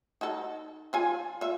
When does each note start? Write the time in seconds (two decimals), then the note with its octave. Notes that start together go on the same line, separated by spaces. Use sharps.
0.21 D#4 F#4 A4
0.93 F3 F4 G#5
1.41 F4 E5